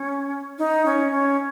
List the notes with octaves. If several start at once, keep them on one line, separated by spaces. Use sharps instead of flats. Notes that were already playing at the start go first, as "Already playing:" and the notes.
Already playing: C#4
D#4
C#4
C#4